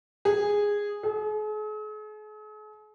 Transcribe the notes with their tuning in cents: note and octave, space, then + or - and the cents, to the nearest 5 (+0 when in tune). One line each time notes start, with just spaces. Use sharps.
G#4 -10
G#4 +45